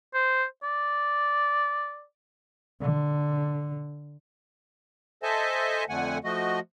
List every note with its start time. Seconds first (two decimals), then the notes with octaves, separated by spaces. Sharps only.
0.14 C5
0.63 D5
2.81 D3
5.23 A4 C5 D#5 E5 G#5 A5
5.89 F2 D3 A3 F#5 G#5
6.24 F3 A3 F#4 D#5